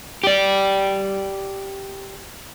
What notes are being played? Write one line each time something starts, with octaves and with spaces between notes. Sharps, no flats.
G4 D5